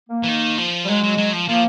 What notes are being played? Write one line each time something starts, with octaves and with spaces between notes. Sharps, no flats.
A#3
E3
D#3
F3
G3
F#3 G#3
F#3
F#3
F3
F3 A#3